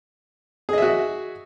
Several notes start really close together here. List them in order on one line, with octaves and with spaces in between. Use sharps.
G#4 D#5 E5 F#4